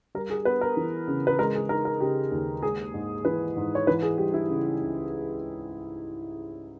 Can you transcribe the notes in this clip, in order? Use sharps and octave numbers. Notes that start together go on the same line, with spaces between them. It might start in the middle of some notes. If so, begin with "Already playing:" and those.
G3 A#4
G#4
B3 B4
A#4
E3
C#3
B4
G#3 A#4
G#4
D#4 A#4
A#4
C#3 G4
D#2
G#3 G#4
G#2
E3 B4
G#2
C#5
E3 B4
G#4
G3 G4
E4
C#3
C#2